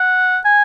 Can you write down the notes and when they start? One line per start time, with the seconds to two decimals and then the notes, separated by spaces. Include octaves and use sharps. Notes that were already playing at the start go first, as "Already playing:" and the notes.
Already playing: F#5
0.45 G#5